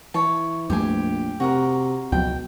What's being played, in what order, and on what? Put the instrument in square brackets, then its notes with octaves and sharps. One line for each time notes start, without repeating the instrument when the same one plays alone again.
[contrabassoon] E3 [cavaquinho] C#5 A5
[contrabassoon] A#1 [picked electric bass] F2 G3 A3 [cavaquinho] G4 C5 G#5
[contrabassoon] C3 [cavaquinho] F#4 G#4 A#4
[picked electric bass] C#2 F3 F#3 [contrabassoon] B2 [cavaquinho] G5